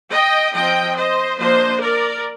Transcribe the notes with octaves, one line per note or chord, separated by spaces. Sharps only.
D#5 G5
F3 C4 D#5 G5
C5 D#5
F3 A#3 D4 C5 D#5
A#4 D5